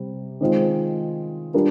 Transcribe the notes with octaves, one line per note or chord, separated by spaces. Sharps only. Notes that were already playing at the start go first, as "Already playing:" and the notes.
Already playing: C3 G3
D#3 G#3 C4 F4
G3 D4 F4 A#4